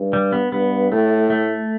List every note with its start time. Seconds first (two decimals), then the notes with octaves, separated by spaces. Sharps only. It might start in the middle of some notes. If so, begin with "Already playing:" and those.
Already playing: G2
0.13 G3
0.32 B3
0.52 G2 B3
0.92 A2 A3
1.30 A3